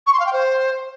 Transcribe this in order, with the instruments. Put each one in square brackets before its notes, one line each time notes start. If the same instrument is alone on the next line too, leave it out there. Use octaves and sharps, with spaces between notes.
[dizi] C#6
C6
F5
G5
C5